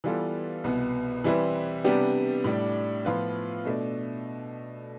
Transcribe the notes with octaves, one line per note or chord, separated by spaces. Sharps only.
E3 G3 B3 F4 A4
C2 B2 B3
E3 G3 C4 E4 B4
C3 G3 B3 D4 G4
A2 G3 D4
A2 F3 B3 F4 B4
B2 A3 D4